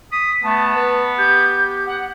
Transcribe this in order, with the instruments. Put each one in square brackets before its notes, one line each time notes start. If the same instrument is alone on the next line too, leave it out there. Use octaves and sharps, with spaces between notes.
[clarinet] D#6 [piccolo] B6
[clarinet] A3 [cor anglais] B3 [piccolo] A5
[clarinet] B4
[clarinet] G4 [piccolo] G6
[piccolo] F#5